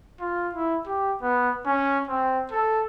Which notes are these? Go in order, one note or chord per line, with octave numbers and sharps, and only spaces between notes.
F4
E4
G4
B3
C#4
C4
A4